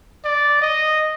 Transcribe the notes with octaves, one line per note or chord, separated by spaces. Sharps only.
D5
D#5